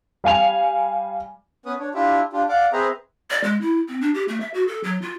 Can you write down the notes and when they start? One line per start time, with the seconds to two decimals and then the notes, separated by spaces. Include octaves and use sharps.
0.24 G3 F5 G#5 F7
1.66 B3 C#4 B4 D#6
1.79 D4 C#5
1.94 D4 E4 F4 G4 E5
2.33 D4 F4 G4
2.49 D5 F5 F#5 D6
2.73 C4 G#4 B4 C5 E5 A#5
3.31 D5
3.44 G#3
3.61 E4
3.88 C4
4.01 D4
4.14 G4
4.28 A3
4.40 E5
4.54 F#4
4.67 A4
4.84 F#3
5.02 F4